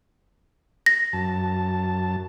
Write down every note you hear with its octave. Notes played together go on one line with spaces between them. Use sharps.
A#6
F#2 A5